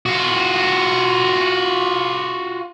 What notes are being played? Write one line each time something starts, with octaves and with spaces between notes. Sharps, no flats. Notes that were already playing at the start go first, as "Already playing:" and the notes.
F4 F#4